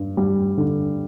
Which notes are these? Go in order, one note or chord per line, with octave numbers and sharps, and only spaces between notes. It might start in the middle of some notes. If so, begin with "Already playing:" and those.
Already playing: G2
G3
D3